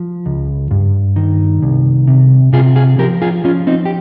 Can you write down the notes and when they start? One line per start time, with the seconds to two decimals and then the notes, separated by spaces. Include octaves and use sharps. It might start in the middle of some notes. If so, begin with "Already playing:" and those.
Already playing: F3
0.26 C#2
0.71 G2
1.16 D#3
1.62 C2
2.08 C3
2.53 C3 F4 G#4
2.76 F4 G#4
2.99 F3 G4 A#4
3.22 F4 G#4
3.44 F3 C#4 F4
3.67 C4 D#4
3.85 G4